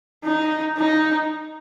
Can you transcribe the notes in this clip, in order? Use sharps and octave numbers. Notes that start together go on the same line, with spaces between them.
D#4
D#4